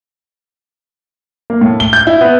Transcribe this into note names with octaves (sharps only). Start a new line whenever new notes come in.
A#3
A2
G7
G6
E4
B3